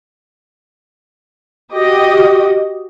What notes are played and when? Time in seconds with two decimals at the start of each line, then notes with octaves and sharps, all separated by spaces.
1.71 F#4 G4 D#5